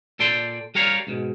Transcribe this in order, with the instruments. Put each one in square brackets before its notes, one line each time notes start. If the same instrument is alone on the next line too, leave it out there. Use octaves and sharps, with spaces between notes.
[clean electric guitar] A#2 A4 D5 G5 C6
G3 G4 A#4 C#5 D5 F5
C#2 G#2 B2